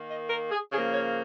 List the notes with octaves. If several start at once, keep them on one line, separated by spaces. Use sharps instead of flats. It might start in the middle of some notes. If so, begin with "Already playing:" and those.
Already playing: D#3 A#3
D#5
A#4
G#4
C#3 F3 A#3 G#4
C#5